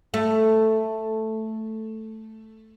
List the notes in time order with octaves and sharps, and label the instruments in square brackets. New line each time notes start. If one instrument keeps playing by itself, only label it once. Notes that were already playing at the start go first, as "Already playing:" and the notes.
[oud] A3